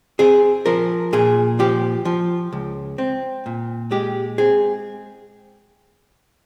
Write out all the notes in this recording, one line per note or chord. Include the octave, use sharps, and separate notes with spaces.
C4 G#4
F3 A#4
A#2 G#4
F3 G4
F3
C#2
C4
A#2
G#3 G4
C4 G#4